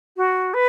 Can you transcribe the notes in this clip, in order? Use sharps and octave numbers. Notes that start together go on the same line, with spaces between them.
F#4
B4